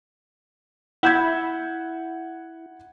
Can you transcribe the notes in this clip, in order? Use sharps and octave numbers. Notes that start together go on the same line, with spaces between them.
E4 F#5 G6 G#6